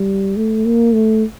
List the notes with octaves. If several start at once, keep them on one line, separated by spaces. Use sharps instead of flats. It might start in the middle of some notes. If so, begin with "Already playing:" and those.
Already playing: G3
A3
A#3
A3